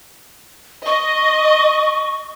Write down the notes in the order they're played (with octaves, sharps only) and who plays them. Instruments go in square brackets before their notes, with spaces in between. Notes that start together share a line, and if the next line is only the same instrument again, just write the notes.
[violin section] D#5 [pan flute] C#6